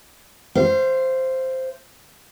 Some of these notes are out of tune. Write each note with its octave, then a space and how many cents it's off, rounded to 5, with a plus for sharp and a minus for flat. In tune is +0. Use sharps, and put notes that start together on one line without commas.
C5 +0 F5 -35